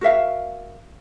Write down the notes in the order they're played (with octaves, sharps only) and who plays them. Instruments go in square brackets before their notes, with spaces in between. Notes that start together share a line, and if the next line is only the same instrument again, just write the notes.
[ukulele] F#4 A#4 E5 F5